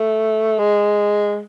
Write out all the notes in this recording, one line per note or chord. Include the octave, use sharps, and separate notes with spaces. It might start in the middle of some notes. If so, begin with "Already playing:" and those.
Already playing: A3
G#3